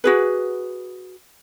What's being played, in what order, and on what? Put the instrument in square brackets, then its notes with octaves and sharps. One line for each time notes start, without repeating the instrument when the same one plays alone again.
[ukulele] F#4 G#4 B4